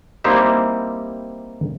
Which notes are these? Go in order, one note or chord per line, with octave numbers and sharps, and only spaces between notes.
G3 A#3 C4 D#4 E4 G4